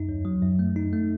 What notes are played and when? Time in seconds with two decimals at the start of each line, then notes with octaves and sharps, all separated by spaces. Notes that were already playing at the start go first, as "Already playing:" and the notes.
Already playing: F#2 D#4
0.09 D#2
0.25 F#3
0.42 F#2
0.59 A3
0.76 D#4
0.93 A3